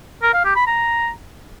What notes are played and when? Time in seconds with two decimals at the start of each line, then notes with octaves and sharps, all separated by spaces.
0.22 A#4
0.33 F5
0.44 G4
0.56 B5
0.67 A#5